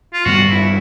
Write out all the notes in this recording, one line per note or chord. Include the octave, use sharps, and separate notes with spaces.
F4
G2 D#3 G3 B3 F#4
E4